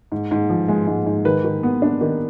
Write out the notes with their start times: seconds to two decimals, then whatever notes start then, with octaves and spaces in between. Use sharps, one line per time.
0.12 G#2
0.31 G#2
0.49 F3
0.68 G#3
0.87 G#2
1.06 G#2
1.25 D#3 B4
1.44 D#3
1.63 B3
1.82 D4
2.01 D#3